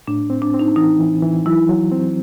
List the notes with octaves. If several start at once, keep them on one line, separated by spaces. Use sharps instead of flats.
A2 D4
C4
D4
C4
D#4
E3 D#4
E3
E3
F#3 E4
F#3
C4